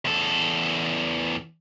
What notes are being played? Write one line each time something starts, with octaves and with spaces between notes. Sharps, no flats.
E2 A4